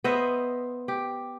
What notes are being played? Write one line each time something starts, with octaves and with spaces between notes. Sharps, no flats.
B3 C5 D#5 E5
G4